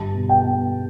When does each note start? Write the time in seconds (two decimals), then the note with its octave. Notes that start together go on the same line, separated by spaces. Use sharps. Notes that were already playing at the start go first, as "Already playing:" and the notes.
Already playing: G2 D3 G3 A5
0.14 B2
0.29 G5
0.44 B3